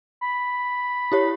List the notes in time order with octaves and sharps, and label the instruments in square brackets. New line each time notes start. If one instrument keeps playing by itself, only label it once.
[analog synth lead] B5
[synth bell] E4 G4 C#5